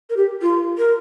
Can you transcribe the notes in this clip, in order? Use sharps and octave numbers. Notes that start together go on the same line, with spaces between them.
A#4
G4
F4
A#4